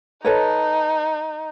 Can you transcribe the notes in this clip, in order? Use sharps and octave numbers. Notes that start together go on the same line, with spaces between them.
D#4 A4 B4 C#5